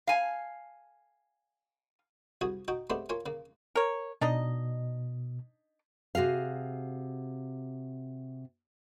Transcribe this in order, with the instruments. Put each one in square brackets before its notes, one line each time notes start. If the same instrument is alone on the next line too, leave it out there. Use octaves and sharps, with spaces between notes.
[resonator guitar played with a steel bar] F5 G#5
[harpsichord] C2 F#4 G#4 G#5 D#6
D#4 F#4 G5
G#3 A3 B3 C4 D4 G4
A#3 F4 C#5 G#5
C#3 A#3
[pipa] A#4 C#5
[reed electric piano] B2 [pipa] D4 D#4 D#5
[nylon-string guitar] C3 F#4 G#4 F5